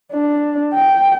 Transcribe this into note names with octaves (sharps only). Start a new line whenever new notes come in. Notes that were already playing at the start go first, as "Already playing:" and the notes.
D4
G5